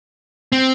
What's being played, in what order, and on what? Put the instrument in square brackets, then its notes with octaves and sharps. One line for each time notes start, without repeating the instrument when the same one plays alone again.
[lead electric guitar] C4